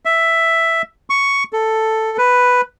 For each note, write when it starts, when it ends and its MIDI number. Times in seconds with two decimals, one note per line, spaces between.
0.05 0.82 76
1.10 1.44 85
1.53 2.17 69
2.18 2.61 71